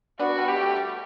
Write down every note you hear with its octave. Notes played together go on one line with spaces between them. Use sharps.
B3 D4 F#4
G3 B3
G4
A3
G3